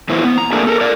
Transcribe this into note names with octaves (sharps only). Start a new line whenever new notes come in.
A#2 E3 B3 E4 C5
B3
A#5
A3 A#3 D4 G#4 A#4 E5
A4 A#4
A#4 D5